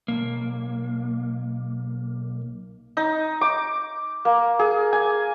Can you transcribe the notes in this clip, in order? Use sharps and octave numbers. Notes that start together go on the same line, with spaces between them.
B1 A#3
D#4
D6
A#3
G#4
G#5